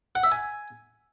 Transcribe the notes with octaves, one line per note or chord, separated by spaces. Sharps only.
F#5
E5
G#5